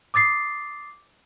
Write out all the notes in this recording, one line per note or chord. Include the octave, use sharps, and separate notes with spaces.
D6 D#6 A6 C7